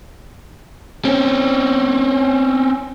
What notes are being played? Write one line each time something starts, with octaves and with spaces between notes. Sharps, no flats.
C4 C#4